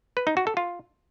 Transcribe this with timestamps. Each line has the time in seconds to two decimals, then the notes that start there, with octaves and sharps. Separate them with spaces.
0.17 B4
0.27 D#4
0.37 F#4
0.47 A4
0.57 F4